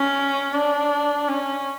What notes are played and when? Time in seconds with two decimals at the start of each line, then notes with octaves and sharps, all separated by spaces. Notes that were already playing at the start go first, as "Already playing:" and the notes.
Already playing: C#4
0.53 D4
1.28 C#4